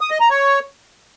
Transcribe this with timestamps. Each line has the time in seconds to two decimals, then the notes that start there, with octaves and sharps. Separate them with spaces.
0.01 D#6
0.10 D#5
0.20 A#5
0.30 C#5